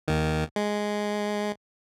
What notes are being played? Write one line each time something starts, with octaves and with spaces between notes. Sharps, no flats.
D#2 D#3
G#3